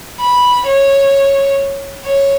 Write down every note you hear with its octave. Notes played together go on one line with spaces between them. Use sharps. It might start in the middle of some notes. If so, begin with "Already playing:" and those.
B5
C#5
C#5